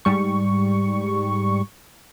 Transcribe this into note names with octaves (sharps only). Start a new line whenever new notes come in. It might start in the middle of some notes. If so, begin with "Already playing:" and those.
G#2 G3 C#6